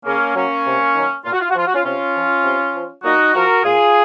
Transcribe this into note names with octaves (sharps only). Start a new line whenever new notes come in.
C#3 A#3 C#4
F#3 A#3 C#4
C3
D#3 F#3
A#2 F4
F#4
F4
F#4
F3 F4
F#4
C#4 F4
C3 C#4 F4
F3
C3
F3
A#2 D#4 F#4
F3 F#4 A#4
A#2 F4 G#4